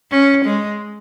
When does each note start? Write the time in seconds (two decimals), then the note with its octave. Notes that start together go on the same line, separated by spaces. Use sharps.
0.11 C#4
0.45 G#3